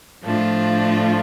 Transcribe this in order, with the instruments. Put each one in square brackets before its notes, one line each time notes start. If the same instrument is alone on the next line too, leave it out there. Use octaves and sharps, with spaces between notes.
[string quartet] A2 F3 A3 D4 F4